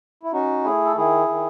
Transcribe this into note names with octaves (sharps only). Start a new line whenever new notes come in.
E4
C#4 D#4 F#4
A3 E4 G#4
A4
D#3 E4 G#4
D#3